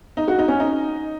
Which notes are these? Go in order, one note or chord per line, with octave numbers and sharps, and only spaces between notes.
D#4
F#4
D#4
C#4
D#4